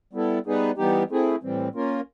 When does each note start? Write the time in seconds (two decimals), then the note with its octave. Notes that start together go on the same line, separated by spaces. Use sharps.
0.13 G3 B3 E4 A4
0.46 G3 B3 D#4 G#4 B4
0.77 E3 G3 B3 D#4 G4
1.10 A3 C4 E4 G#4
1.42 A2 E3 G3 C4
1.74 A#3 C#4 F4 A#4